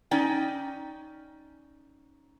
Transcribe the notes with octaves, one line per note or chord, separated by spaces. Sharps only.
C#4 D#4 D5 G5